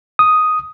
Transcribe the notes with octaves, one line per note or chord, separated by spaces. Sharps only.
D#6